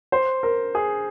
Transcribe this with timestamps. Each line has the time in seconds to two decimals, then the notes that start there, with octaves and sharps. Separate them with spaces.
0.12 C5
0.43 A#4
0.75 G#4